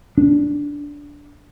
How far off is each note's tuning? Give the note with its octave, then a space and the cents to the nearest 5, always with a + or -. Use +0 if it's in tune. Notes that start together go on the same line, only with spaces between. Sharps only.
D4 -10